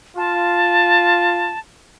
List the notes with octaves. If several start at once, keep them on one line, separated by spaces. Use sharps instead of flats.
F4 A5